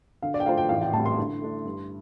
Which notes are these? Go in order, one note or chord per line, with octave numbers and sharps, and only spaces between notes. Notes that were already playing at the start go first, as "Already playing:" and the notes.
D3 F5
D5
G5
A3 F4 C5 F5
G5
A1 F5
G5
A2 G3 C4 A5
C6
D3
A3 D4
G2